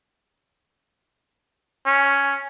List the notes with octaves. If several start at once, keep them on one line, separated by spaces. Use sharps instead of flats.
C#4